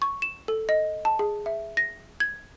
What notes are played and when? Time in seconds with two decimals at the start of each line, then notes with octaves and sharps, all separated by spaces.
0.02 C#6
0.22 E7
0.48 A4
0.69 D#5
1.05 A5
1.19 G#4
1.46 E5
1.77 A#6
2.20 G#6